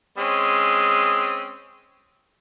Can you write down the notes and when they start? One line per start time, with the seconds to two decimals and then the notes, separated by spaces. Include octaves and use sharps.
0.18 G#3 C4 C#4